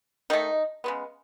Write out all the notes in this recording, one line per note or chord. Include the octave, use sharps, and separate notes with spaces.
D#3 A3 D#4
C#3 G#3 B3